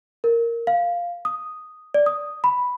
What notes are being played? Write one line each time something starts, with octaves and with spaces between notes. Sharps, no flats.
A#4
F5
D#6
D5
D#6
B5